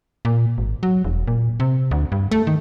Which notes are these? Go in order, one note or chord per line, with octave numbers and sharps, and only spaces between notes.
A#2
G#1
F#3
E1
A#2
C3
D2
G2
A3
D#3